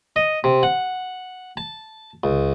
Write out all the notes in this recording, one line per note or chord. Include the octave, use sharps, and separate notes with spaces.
D#5
C3
F#5
A5
C#2